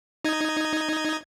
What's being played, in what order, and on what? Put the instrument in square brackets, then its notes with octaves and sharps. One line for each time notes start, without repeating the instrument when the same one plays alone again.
[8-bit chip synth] D#4 D#5 G#6